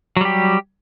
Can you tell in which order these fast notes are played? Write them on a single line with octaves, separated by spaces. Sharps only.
F#3 G3 G4